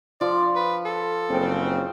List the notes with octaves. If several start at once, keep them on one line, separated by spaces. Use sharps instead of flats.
F3 D5
B4
A4
F#1 C#3 C4